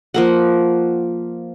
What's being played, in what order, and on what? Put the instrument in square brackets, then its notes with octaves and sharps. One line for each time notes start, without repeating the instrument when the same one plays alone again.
[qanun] F3 A#3 F#5